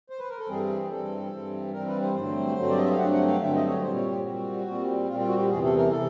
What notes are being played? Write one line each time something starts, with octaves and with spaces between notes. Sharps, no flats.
C5
B4
A#4
A4
G2 E3 G3 C4 G#4
G2 E3 G3 C4 A4
G2 E3 G3 C4
G2 E3 G3 C4 A#4
B4
C5
G2 D3 F#3 A3 C4 C5
G2 D3 F#3 A3 C4
D5
D#5
E5
F5
G2 D3 F#3 A3 C4 F#5
F#5
F5
G2 D3 F#3 A3 C4 E5
D#5
C#5
A#2 G3 C4 C5
C#5
G4
A#2 G3 C4 F#4
A#2 G3 C4
A#2 G3 C4 F4
F4
F#4
G4
E2 C3 E3 G#4
A4
A#4
G#4
C3 A4